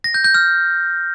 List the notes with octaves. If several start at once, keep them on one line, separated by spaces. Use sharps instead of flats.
A#6
G6
G6
F6